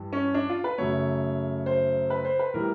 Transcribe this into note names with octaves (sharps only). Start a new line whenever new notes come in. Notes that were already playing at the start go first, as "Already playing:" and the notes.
Already playing: G2 E3 G3
C#4
D4
F4
B4
F#2 C#3 F#3 A3 C#5
C5
B4
C5
B4
A2 E3 G3 A#4